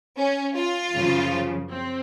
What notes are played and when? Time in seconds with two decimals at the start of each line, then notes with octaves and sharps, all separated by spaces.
0.17 C#4
0.56 F4
0.94 F#2 C#3 F3
1.72 C4